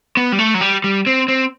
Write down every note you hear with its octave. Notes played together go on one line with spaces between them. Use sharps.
B3
G3
A3
F#3
G3
G3
C4
C4